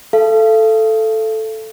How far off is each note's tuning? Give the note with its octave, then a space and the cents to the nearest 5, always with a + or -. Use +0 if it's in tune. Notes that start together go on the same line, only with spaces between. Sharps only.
A4 +0 F5 -40 A5 -15